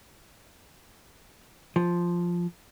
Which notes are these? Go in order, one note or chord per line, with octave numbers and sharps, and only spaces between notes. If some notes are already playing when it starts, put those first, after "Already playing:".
F3